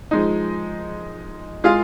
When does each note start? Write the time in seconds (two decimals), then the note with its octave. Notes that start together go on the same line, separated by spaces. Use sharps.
0.11 F3 G#3 D#4
1.64 G#3 F4 G#4 F5